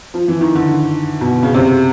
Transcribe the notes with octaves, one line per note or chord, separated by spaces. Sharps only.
F3
E3
D#3
D3
B2
C#3
C3